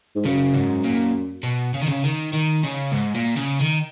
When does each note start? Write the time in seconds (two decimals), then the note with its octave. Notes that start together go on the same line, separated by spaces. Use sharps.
0.15 G#2
0.25 F#2 C#3
0.54 G#2
0.84 A#2
1.43 B2
1.74 C#3
1.81 D#3
1.88 C#3
2.04 D#3
2.33 D#3
2.63 C#3
2.92 G#2
3.15 A#2
3.36 C#3
3.60 D#3